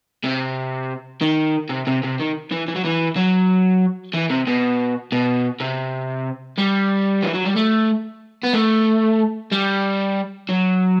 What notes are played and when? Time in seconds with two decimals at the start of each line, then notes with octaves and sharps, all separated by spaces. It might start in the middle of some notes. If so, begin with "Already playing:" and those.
0.24 C3
1.21 D#3
1.70 C3
1.87 C3
2.03 C3
2.20 D#3
2.51 E3
2.68 E3
2.75 F#3
2.85 E3
3.16 F#3
4.14 E3
4.30 C3
4.47 B2
5.12 B2
5.60 C3
6.58 G3
7.23 E3
7.34 F#3
7.45 G3
7.56 A3
8.43 B3
8.53 A3
9.51 G3
10.49 F#3